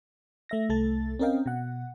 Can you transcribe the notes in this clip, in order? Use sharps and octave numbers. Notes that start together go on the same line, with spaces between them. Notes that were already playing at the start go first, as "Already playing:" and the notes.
A3 E5 A#6
C2 A3 A4 A6
C4 C#4 A#4 D#5 F5 G5
B2 F#5